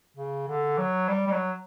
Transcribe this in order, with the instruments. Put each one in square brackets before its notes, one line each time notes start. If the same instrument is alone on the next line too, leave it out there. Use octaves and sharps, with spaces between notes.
[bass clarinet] C#3
D3
F#3
G3
G3
F#3